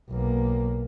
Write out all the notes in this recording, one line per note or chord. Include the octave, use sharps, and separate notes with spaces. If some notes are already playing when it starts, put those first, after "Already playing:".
B1 A#3